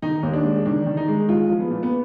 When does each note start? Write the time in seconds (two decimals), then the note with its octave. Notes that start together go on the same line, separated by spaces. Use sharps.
0.02 D#3 D#4
0.23 D#2
0.33 D4
0.45 G#3
0.66 D#3 D4
0.86 D#3
0.97 D#4
1.08 G#3
1.29 G#3 F4
1.50 F3
1.60 B3
1.70 A#2
1.83 B3